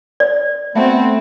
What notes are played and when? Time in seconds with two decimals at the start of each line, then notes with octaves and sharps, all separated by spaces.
0.20 D5
0.75 A3 B3 C4 F#4